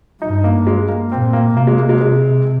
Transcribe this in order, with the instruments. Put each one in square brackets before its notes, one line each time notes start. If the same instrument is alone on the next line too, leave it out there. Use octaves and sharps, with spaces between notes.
[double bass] G2 [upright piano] D#4
[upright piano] A#3
G#3
A#3
[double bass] A#2 [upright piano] C4
[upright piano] A#3
[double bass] C3 [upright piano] A#3
[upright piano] G#3
A#3
G#3
G#3